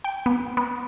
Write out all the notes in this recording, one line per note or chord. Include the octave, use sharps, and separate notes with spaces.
G5
B3
B3